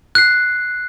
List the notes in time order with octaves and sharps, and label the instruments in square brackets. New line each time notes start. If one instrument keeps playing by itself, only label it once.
[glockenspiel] F#6 C7